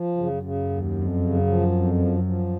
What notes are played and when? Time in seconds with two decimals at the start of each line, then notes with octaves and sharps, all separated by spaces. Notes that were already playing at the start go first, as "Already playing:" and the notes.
Already playing: F3
0.17 F#2 C#3
0.43 C#3
0.70 D#2
0.95 F2
1.21 C#3
1.47 F3
1.72 F2
1.98 F3
2.24 F3